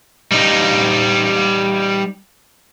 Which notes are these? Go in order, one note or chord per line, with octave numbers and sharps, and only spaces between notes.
G3 D#4